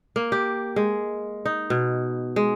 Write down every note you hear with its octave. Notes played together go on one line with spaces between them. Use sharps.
A#3
G4
G#3
D#4
B2
G#3